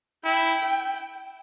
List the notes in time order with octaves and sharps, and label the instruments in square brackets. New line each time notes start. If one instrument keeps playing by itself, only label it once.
[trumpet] E4 [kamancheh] G5